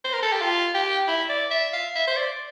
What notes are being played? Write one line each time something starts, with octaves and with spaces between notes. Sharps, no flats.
C5
A#4
A4
G4
F4
G4
E4
D5
E5
F5
E5
C5
D5